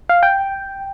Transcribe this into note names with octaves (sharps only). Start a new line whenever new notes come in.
F5
G5